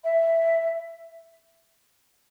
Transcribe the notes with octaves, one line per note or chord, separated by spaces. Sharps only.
E5